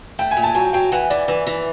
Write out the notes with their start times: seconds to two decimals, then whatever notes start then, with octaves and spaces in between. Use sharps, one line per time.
0.19 A3 G5
0.31 G#5
0.37 A#2
0.43 A5
0.55 F#3 G#5
0.73 F#3 G5
0.92 E3 F#5
1.10 E3 D5
1.28 E3
1.47 E3